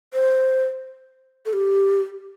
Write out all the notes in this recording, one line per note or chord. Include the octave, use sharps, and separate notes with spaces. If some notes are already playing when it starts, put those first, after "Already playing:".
C5
A4
G4